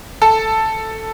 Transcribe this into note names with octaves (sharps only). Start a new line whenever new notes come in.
A4 A5